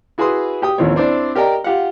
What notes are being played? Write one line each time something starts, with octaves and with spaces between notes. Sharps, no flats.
E4 F#4 G#4 B4 C6 D#6
G4 G5 D#6
A1 D#2 F3 C4 E4 C#5
C4 D4 E4 C5 D5
G4 A#4 D5 D#5 G5 A#5
F4 G4 F5 F#5